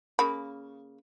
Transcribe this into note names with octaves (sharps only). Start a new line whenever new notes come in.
C#3 A#3 B5